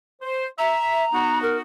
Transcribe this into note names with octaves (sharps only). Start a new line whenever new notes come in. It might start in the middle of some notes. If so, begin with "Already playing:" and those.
C5
E5 A#5
B3 D#4 F#4
A#4